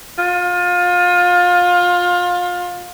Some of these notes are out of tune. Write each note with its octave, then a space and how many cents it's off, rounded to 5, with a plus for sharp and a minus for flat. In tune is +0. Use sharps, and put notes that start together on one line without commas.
F4 +25